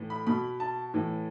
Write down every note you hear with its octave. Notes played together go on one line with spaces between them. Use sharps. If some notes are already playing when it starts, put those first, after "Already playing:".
Already playing: A2 E3
B5
B2 B5
A5
A2 E3